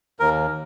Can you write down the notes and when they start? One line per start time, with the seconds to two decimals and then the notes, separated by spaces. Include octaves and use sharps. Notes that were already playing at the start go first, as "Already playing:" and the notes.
0.20 D#2 A#4